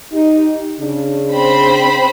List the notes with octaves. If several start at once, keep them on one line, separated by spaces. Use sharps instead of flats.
D#4 G4
C#3 D4
C4 C5 B5